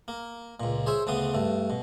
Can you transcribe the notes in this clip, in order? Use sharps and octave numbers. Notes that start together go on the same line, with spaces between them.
A#3
C#2 A#2
G#4 C5 C#5 E5
D2 C#3 B3 D#6
G2 A3
B2